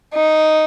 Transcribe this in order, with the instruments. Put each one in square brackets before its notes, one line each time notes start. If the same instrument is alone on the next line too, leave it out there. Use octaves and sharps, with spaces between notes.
[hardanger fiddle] D#4